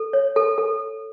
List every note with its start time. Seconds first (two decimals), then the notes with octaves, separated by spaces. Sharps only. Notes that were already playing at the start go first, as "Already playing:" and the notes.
Already playing: A4
0.13 C#5
0.36 A4
0.58 A4